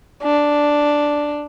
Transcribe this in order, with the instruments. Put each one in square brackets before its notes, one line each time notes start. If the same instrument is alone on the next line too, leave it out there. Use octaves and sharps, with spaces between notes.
[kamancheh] D4